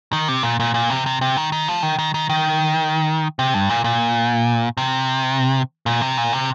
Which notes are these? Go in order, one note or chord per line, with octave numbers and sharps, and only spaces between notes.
D#3
C3
A#2
A#2
A#2
C3
C3
C3
D#3
D#3
F3
D#3
D#3
D#3
D#3
C3
G2
A#2
A#2
C3
A#2
C3
A#2
C3